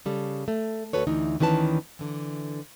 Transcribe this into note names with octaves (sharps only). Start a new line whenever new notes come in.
C#3 G3 A4
A3
D2 B2 F#4 A4 B4 C#5
D2 E3 D#4
D2 D#3 E3 C#4 B4 A5
D3 E3